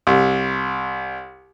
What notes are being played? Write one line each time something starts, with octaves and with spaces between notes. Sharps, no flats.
C2